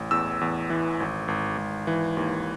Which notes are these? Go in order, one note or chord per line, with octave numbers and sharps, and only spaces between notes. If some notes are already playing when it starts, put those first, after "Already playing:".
Already playing: A1
E2 E6
E2
E3
G#1
G#1
G#1
E3
D#2